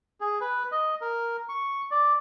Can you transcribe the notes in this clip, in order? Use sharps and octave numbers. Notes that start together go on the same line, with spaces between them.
G#4
B4
D#5
A#4
C#6
D5